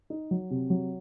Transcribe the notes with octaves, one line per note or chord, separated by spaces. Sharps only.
D#4
F#3
C3
F#3